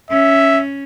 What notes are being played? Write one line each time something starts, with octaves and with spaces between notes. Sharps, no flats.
C#4 E5